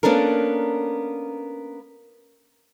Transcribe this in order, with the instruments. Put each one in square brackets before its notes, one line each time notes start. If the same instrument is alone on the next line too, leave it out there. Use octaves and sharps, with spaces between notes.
[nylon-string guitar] A#3 B3 C#4 D4 A4 A#4